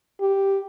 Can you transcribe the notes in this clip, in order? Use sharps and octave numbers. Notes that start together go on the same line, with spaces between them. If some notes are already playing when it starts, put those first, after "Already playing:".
G4